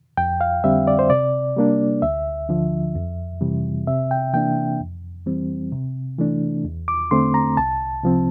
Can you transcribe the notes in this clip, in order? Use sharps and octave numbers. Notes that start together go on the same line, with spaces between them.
F2 G5
F5
D3 G3 C4 E5
D5
C5
C3 D5
G3 A#3 D4
D2 E5
D3 F3
F2
C3 E3 G3
C3 E5
G5
E3 A#3 D4 G5
F2
E3 G3 C4
C3
E3 A3 D4
E2
D6
D3 A3 C4 C6
A#5
C2 A5
C3 F3 C4